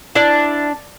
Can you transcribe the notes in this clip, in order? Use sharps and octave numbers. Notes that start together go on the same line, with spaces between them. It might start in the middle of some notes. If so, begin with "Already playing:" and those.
D4 E4 D5